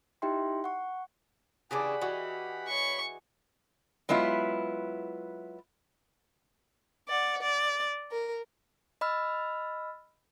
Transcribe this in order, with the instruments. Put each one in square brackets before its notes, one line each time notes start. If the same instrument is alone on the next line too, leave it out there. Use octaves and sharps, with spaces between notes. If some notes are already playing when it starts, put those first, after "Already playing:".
[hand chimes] D#4 E4 G4 E5 G5 C6
F#5 C#6
[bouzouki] C#3 E3 D4 [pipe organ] G4 F#5 B5 [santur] G#4 D5
[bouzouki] E3 [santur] F#4 D#5
[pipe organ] C#5 B5 [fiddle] C#6
[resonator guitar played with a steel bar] F#3 G#3 B3 E4 F4
[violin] D5 F#5
D5
A#4
[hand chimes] D#5 B5 E6 F6